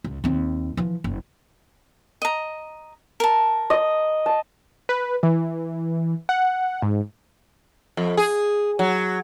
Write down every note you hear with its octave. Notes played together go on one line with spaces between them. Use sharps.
C#2
D#2 C4
E3 F3
F#1
D#5 A#5
A#4 A5
D#5
A5
B4
E3
F#5
G#2
F2
G#4
F#3